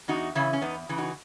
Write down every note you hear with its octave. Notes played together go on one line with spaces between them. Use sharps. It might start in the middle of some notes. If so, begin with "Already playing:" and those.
E2 D#4 F#4
C#3 E3 C#4 E4
C#4
E2 B3 D#4
C#3 E3
D#4 F#4